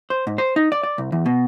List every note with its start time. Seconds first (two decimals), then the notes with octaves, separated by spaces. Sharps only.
0.10 C5
0.27 G#2
0.38 C5
0.56 D#4
0.72 D5
0.83 D5
0.98 C2
1.12 E2
1.26 B2